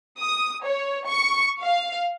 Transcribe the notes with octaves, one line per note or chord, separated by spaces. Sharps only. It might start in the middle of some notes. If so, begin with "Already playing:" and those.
D#6
C#5
C#6
F5